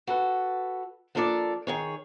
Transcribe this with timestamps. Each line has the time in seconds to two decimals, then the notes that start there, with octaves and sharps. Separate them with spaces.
0.07 F#4 A4 B4
1.15 F3 A#3 D4 A4 A#4 D5
1.67 D#3 G#4 C#5